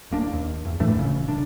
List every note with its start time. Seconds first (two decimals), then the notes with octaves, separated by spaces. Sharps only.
0.11 D#1 A#3 D4
0.33 D#2
0.65 E2
0.80 A2 E3 A3 D4
0.96 D#1 C#3
1.28 D#1 C2 D4